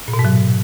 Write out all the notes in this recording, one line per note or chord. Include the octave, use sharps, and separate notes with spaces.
A#2
B2
G#2
F#3